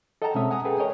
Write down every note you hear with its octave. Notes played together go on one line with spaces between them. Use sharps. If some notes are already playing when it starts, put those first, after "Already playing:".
A4 D#5 F#5 G5 A5 A#5
B2 G#3 C4 C#4 E5 D#6
F#5 G#5 A#5 D#6
G#4 A4 B4 G5
A#4 C#5 D#5 G5 G#5